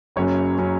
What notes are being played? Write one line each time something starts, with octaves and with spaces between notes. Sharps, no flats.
F#1 F#2 F#3 C#4 C#5
F#3 C#4